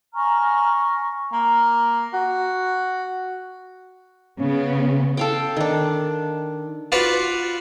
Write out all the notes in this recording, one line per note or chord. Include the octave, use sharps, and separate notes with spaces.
G#5 A#5 C#6 F6
A#3
F#4
C#3 B3
A4 F5 G5
D#3 D4
F4 F#4 B4 D5 F5